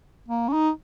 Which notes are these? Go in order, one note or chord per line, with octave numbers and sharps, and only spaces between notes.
A#3
C#4
D#4